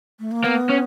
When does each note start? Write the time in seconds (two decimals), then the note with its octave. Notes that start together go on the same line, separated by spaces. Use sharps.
0.20 A3
0.31 A#3
0.44 A#3 B3
0.69 C#4